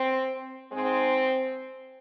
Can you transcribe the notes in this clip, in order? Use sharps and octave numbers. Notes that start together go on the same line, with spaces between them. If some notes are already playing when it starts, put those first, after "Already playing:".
Already playing: C4
G#2 G#3 C4